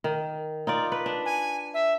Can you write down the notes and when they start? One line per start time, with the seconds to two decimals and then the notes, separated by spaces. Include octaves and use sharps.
0.04 D#3
0.67 D#4 F4 D5
0.92 B4
1.06 D4
1.26 G#5
1.74 E5